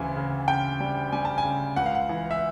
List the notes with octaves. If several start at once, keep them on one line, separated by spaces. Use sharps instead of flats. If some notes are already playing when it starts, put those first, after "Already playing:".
Already playing: D2 C#3 E3 G#5
C#3
C#3 G5
G3
G3 G#5
A5
G#5
C#3
C#2 F#5
F5
F#5
E3
E5